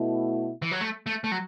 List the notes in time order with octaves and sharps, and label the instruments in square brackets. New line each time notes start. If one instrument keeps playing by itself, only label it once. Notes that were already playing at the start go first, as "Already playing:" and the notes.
Already playing: [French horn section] B2 A3 E4
[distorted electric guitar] E3
F#3
A3
A3
A3
F#3